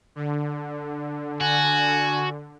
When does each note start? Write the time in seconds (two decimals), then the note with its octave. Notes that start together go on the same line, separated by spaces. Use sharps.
0.15 D3
1.41 F#4 G#5